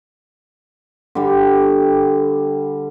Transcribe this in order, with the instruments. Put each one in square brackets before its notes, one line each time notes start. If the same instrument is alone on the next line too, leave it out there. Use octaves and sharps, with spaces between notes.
[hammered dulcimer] D3 G3